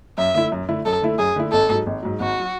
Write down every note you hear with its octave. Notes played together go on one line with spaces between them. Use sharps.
F#2 E5
D3 A3 E4
F#2
D3 A3 E4
F#2 A4
D3 A3 E4
F#2 G#4
D3 A3 E4
G#1 A4
G#2 F#3
G#1
G#2 F#3
G#1 F#4
F#3